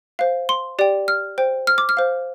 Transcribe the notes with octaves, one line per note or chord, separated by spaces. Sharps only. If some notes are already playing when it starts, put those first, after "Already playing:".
C5 F5
C6
G4 D5 G5
F6
C5 G5
F6
D6
F6
C5 F5